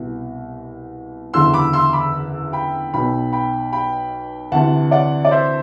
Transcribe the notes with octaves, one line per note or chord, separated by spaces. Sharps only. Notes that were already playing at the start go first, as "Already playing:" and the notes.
Already playing: C2 B2
F#1 E2 D3 C6 E6
B5 D6
C6 E6
B5 D6
G5 B5
B1 B2 G5 B5
G5 B5
G5 B5
D2 C3 E3 F#5 A5
D5 F#5
D5
C5 E5